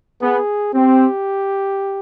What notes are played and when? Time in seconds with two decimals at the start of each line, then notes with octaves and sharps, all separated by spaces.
0.22 B3 G#4
0.74 C4 G4